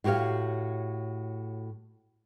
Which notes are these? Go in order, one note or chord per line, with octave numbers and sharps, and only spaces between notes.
A2 F#4 G4 C#5 F5